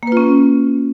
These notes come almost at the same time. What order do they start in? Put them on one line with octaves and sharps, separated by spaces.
A#3 B4 F4 C#4